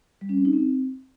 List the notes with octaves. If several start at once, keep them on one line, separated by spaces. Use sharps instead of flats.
G3
C#4
C4
D#4
C4